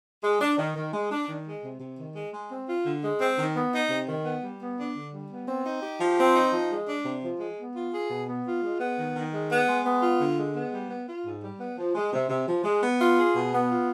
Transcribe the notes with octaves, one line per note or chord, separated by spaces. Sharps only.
G#3
D4
D#3
D#3
G#3
D4
D#3
G#3
C3
C3
D#3
G#3
G#3
C4
F4
D3
G#3
C4
D#3
B3
D#4
C3
D#3
B3
G3
B3
D4
D3
G3
B3
C4
D#4
G4
F3
C4
D#4
F3
G#3
D4
C3
F3
G#3
B3
F4
G#4
B2
B3
F4
G#3
B3
D#3
D#3
G#3
B3
G#3
B3
F4
D3
G#3
B3
G3
B3
F4
G#2
G3
B3
F3
G#3
C3
C3
F3
G#3
B3
F4
G#4
B2
B3
F4